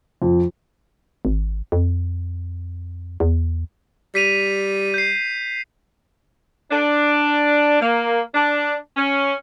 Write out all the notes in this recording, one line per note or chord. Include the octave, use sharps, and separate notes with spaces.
F2
G#1
F2
E2
G3 B6 D#7 F7
G6 C7
D4
A#3
D4
C#4